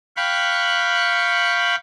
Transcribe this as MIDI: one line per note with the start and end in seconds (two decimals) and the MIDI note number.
0.17 1.75 77
0.17 1.75 79
0.17 1.75 83
0.17 1.75 85
0.17 1.75 90